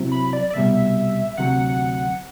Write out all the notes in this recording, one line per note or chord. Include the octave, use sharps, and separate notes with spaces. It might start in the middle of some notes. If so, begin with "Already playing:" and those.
Already playing: C3 F#3 C4 E4
B5
D5
D5
C2 B2 G3 E5
D2 C3 F#3 F#5